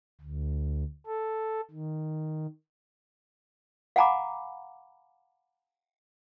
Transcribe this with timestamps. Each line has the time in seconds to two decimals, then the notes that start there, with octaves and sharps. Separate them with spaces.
0.21 D2
1.07 A4
1.71 D#3
3.96 F5 F#5 G#5 A#5 B5 D6